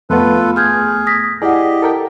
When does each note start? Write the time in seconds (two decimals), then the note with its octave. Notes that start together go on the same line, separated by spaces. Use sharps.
0.10 F2 A3 B3 F4 A4 B4
0.56 G#4 F6 G6 G#6
1.07 D#6 A#6 B6
1.42 E4 G4 G#4 D5 D#5 F#5
1.82 A4 A#4 G5